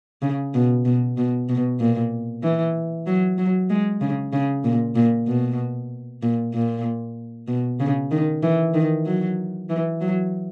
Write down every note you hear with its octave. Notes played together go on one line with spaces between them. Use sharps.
C#3
B2
B2
B2
B2
A#2
E3
F#3
F#3
G#3
C#3
C#3
A#2
A#2
B2
A#2
A#2
B2
C#3
D#3
E3
D#3
F#3
E3
F#3